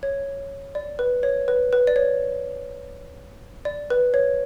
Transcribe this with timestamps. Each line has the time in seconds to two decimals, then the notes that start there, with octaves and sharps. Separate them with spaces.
0.03 C#5
0.75 D5
0.99 B4
1.23 C#5
1.48 B4
1.73 B4
1.87 D5
1.96 C#5
3.65 D5
3.90 B4
4.14 C#5